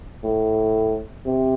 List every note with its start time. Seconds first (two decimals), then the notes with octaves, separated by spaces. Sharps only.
0.24 A2
1.26 C3